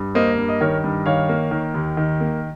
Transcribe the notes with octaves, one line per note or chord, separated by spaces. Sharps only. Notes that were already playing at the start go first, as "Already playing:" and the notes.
Already playing: G2
A#3 C5 D#5
G2
D#5
D#3 A#4 C#5
G2
D#3 C#5 F5
A#3
D#3
D#2
D#3
A#3